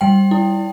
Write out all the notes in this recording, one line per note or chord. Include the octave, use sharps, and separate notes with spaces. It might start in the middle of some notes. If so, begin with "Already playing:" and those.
G3 G5
E4